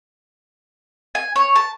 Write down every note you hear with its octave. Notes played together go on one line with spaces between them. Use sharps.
G#5
C#5
A5